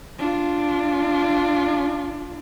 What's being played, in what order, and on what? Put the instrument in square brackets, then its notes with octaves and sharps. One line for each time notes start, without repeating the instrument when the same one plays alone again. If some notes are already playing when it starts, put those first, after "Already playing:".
[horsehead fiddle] D4 F4